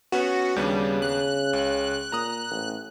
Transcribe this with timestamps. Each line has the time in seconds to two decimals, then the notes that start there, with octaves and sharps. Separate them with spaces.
0.12 B3 C#4 F#4 B4
0.56 D#2 C#3 G3 B3 D4
1.02 F#6
1.53 C#2
2.12 A#2 A#5 D#6
2.50 A1